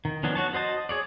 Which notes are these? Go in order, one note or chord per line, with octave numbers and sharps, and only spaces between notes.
D#3
D#3 F3 B3 C#4 D4
F#4 C#5 A5
F#4 C5 D#5 A5
G#4 C#5 D5